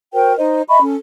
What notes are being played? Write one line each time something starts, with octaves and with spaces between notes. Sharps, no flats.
F#4 A#4 C5 G5
D#4 C5 D#5
D#5 E5 B5 C#6
C#4 A4